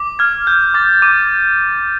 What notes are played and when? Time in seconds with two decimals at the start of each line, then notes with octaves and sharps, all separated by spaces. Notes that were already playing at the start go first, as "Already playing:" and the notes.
Already playing: D6
0.19 F6 G#6
0.47 F6 G6
0.74 D6 A6
1.02 D6 D#7